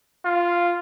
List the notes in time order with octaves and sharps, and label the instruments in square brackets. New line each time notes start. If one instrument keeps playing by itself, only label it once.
[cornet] F4